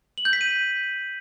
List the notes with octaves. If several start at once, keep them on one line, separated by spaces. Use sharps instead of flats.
F#7
G6
B6
D#7